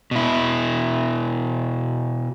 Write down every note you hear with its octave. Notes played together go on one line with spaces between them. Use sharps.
B2 E4